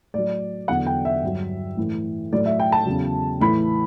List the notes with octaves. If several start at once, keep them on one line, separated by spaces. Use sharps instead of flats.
A2 F#3 D5
E2 D3 F#3 F#5
G5
E5
G2 F#3
A2 E3
A2 F#3 D5
E5
G5
A5
E2 C#3 F#3
A2 E3 B5